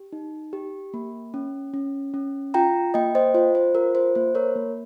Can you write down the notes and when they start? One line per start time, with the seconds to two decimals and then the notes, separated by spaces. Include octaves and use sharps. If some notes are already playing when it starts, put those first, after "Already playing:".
Already playing: G4
0.13 D#4
0.53 G4
0.94 A#3
1.34 C#4
1.74 C#4
2.14 C#4
2.54 F4 G5 A#5
2.94 A#3 D#5 G5
3.15 C5 D#5
3.34 F4 C5
3.55 C5
3.75 F4 A#4
3.95 C5
4.15 A#3 C5
4.35 A#4 C#5
4.56 A#3